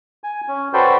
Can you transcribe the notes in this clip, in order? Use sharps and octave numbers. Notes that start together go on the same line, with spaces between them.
G#5
C#4
F#4 A4 B4 C5 D5 G5